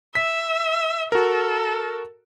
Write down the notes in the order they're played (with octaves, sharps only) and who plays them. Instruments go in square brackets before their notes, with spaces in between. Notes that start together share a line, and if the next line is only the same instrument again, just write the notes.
[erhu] E5 [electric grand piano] B6
[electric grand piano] F#4 A#4 [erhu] A4